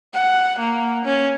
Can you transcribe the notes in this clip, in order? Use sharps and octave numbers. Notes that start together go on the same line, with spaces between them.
F#5
A#3
C#4